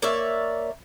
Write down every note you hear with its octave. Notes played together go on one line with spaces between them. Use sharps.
A#3 C#5 D5 E5